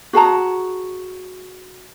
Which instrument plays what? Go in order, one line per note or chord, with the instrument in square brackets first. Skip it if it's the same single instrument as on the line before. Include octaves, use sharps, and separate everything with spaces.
[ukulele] F#4 G#4 A5 A#5